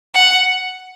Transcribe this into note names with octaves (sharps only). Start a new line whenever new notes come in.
F#5